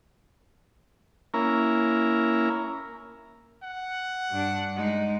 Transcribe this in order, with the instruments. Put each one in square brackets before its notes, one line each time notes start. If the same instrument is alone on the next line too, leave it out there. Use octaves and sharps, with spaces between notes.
[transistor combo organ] A#3 C#4 E4 A#4
[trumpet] F#5
[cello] G2 D4
G#3 D#4